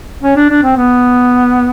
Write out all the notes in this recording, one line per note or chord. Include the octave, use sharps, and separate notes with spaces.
C#4
D4
D4
C4
B3